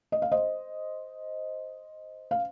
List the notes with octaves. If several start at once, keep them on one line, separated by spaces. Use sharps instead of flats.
D#5
F5
C5 D#5
F5